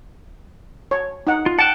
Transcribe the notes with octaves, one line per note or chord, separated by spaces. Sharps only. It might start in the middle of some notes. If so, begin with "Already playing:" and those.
C#5
D#4 F#5
F4
F#5 G5 A5 F#6